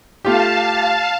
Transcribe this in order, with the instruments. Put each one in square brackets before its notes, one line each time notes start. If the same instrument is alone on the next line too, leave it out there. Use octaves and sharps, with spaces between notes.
[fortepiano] A3 F4 G4 [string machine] F5 A5